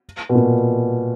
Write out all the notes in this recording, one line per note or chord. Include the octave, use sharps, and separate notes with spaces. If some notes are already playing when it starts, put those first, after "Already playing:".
B2
A#2